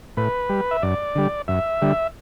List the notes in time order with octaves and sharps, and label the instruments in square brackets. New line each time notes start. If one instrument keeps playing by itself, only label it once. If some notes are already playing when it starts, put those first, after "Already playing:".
[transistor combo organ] A2 B4
G3
E5
F#2 D5
D3 G3
F#2 E5
D3 G3